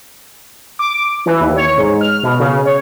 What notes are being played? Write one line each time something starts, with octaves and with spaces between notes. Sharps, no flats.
D6
E3
D#2
C#5
G#2
F6
B2
C#3
C#5